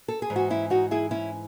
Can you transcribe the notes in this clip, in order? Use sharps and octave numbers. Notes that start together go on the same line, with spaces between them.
A4
G#4
G#2 E3
F#4
C#4 E4
D#4 F#4
E4 G#4
C#4 E4